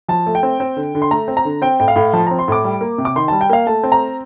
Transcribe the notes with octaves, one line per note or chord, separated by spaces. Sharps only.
F3 A5
A3
G5
C4
C4
D3
D3
C6
A3 A#5
C4
A#5
D3
C4 G5
A2 G5
F5
A2
F3 A5
C4 A#5
C6
A2 D6
G3
A#3
C3
D6
D#3 C6
G3 A5
G5
A#3 F5
A3 A5
C4
A#5